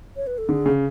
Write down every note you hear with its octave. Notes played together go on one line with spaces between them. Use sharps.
C#5
B4
A4
D3 G#4
C#3